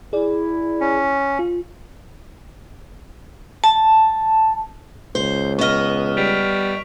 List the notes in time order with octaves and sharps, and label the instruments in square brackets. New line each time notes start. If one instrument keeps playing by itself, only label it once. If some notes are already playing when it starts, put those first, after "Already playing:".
[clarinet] E4 [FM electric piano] G#4 D5
[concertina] C#4
[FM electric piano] F4
[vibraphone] A5
[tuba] C#2 [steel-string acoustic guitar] C5
[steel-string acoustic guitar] B3 D#5 [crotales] C#6 F6
[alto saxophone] G3 [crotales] B6 D7 F7